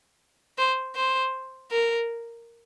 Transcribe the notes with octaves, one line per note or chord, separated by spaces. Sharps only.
C5
C5
A#4